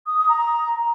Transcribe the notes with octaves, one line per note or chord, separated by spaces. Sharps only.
D#6
D#6
A#5